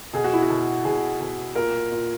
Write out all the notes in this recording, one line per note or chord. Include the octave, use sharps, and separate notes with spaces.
B2 G#4
F#4
E4
F#4
B2
B2 G#4
B2
A#2 A#4
A#2